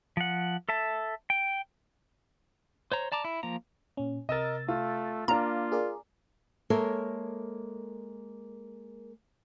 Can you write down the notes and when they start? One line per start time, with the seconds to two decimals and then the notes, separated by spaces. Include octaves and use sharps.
0.17 F3 F#5
0.69 A4 E5 A5
1.30 G5
2.92 C5 C#5 A#5
3.12 D5 A5 A#5 D6
3.24 E4
3.43 F3 A#3 A#5
3.97 A#2 C#4
4.29 C3 A#4 D#5 E6 A6
4.68 A3 F4
5.28 A#3 D4 F4 A#5
5.72 G#4 A#4 D5
6.70 G#3 A#3 A4 A#4 C#5 E5